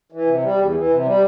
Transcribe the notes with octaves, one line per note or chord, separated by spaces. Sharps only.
E3
C3
G3
E2
E3
C3
G3